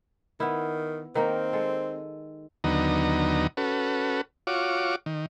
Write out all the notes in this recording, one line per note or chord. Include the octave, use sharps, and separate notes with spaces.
D#3 B3 E4
D#3 A#3 C4 A#4
G#3 A4
D#2 D3 F#3 B3 D#4 A#5
C#4 F#4 A4 B4
F4 F#4 C#5 D6
D#3